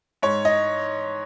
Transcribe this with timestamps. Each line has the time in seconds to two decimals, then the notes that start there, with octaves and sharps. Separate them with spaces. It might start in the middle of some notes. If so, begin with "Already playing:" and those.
0.22 G#2 C#5
0.45 D#5